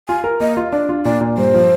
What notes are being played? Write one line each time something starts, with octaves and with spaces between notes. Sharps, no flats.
F4 G#5
A#4
A#3 D#5
F4
D4 D5
F4
A#2 D5
A#2
G2 C5
F3